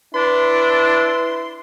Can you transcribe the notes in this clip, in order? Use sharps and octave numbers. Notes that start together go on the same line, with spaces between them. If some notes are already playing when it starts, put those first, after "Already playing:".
D4 E4 B4 C6